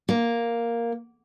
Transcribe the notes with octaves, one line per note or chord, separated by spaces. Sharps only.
A#3